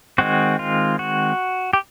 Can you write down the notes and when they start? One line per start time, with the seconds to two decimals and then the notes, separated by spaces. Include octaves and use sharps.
0.18 D#3 G#3 C4 F#4
0.59 F4
0.99 F#4
1.73 G4